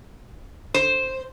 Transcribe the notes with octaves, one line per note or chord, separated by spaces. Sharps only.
C5